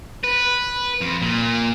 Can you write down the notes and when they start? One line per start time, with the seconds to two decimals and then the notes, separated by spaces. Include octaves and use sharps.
0.24 B4
1.01 F2
1.22 A#2